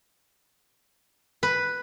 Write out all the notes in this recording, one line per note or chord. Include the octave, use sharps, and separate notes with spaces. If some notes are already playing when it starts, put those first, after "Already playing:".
B4